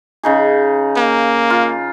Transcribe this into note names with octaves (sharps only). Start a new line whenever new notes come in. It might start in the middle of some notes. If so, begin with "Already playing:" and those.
C#3 D#4 G#4
A#3
F4